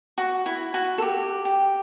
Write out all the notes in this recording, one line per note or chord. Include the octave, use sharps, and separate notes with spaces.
F#4
E4
F#4
A4
G4
G4